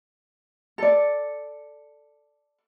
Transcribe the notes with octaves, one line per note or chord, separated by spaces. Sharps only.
A4 D5